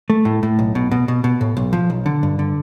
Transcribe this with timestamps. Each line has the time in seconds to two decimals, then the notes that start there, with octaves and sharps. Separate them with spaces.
0.10 A3
0.25 A2
0.43 A2
0.59 B1
0.75 B2
0.91 B2
1.08 B2
1.24 B2
1.41 A2
1.57 B1
1.73 F3
1.90 B1
2.06 D3
2.23 G2
2.39 D3